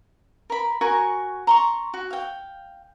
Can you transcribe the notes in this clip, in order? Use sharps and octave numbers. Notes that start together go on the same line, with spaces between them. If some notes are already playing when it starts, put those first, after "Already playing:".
A#4 B5
F#4 A#4 G#5 C#6
A#5 C6 C#6
F#4
F5 G5